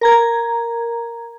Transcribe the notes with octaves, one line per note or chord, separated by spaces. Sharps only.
A#4 A#5 G#6